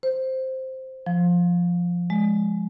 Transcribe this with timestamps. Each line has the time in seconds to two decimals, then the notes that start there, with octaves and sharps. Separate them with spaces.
0.03 C5
1.06 F3
2.10 G#3